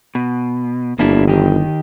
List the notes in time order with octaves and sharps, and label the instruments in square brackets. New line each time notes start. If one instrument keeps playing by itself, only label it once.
[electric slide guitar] B2
[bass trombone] G1 [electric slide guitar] A#3 D4 E4
[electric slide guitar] D#3 G4